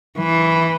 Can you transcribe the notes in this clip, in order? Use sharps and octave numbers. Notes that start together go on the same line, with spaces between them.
E3